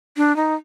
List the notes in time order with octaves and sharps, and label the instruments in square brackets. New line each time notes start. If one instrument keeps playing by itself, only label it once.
[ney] D4
D#4